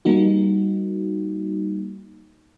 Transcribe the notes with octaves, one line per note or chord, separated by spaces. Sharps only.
G3 A#3 D#4 F#4